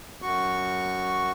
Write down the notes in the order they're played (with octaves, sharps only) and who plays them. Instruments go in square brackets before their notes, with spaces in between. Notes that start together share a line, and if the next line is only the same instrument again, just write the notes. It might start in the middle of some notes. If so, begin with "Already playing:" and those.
[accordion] F#2 F#4 C#6